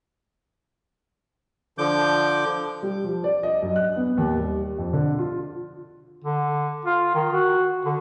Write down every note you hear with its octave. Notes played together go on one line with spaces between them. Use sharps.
D3 F3 D6 G6
G3
F3
D5
D#5
F#2
F#6
B3
D#2
G3
F2
D3
F4
D3
F4
D#3
F#4
D3